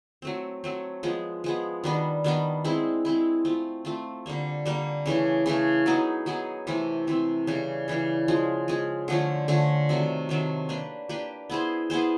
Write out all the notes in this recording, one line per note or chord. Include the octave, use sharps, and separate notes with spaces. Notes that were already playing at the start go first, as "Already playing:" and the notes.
F#3 A3 C4
F#3 A3 C4
F3 G#3 B3
F3 G#3 B3
D#3 G3 B3 D4
D#3 G3 B3 D4
G#3 C4 E4
G#3 C4 E4
A3 C4 F4
A3 C4 F4
D3 G3 A#3
D3 G3 A#3
C#3 E3 A3 C#4
C#3 E3 A3 C#4
F#3 B3 D#4 G#4
F#3 B3 D#4 G#4
C3 E3 A3 C4
C3 E3 A3 C4
C#3 E3 G3
C#3 E3 G3
F3 G#3 C#4
F3 G#3 C#4
D3 F3 A3 C#4
D3 F3 A3 C#4
C3 D#3 F#3 A3
C3 D#3 F#3 A3
A#3 D4 G4 B4
A#3 D4 G4 B4
B3 E4 G#4 C5
B3 E4 G#4 C5